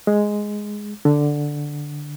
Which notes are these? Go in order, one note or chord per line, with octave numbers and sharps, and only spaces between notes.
G#3
D3